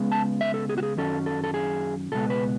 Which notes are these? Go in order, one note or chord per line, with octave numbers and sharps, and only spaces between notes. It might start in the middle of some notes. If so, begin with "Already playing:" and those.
Already playing: C#2 C#3 G#3 B3
A5
E5
A4
G#4
F#4
G#4
F#2 D#3 F#3 C#4 A4
A4
A4
G#4
C#2 B2 G#3 B3 A4
B4